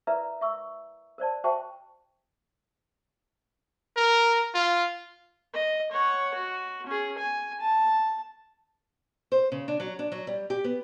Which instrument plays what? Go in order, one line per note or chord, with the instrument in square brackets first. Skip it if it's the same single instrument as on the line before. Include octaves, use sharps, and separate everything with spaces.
[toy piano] E4 A#4 B4 D5 E5 A#5
E5 C#6 E6
A#4 C5 D5 A5
F#4 C5 E5 G5 A5 C#6
[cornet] A#4
F4
[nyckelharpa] D#5
C#5 F#5
F#4
C#4 G#4
G#5
A5
[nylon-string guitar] C5
C#3
D4
F#3
D4
F#3
G3
G4
B3